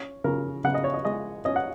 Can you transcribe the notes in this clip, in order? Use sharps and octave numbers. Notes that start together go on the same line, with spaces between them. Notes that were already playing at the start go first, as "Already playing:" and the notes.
Already playing: C#4
C#3 A#4
C#3 F#5
D#5
C#5
D#5
G#3 D#5
C#4 D#5
F#5